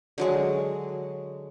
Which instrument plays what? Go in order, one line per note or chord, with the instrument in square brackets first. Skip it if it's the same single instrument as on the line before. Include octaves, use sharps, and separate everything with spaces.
[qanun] D3 F#3 G#3